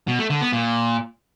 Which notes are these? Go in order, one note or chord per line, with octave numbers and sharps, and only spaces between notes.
B2
A3
D3
B3
A#2